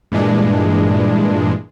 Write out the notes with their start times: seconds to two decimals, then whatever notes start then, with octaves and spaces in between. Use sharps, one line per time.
0.12 G2 A#2 E3 G#3 D4